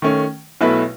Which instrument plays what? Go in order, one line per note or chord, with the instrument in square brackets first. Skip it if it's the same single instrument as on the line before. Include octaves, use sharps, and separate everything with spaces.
[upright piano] D#3 A3 C#4
B1 B2 A3 E4 B4